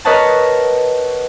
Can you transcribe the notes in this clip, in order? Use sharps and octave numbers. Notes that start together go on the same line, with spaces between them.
A#4 B4 C#5 D#5 F#5 A5